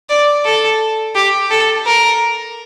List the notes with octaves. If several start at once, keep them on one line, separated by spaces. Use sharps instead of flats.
D5
A4
G4
A4
A#4